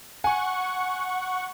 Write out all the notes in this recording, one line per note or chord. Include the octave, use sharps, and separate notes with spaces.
F#5 G#5 C#6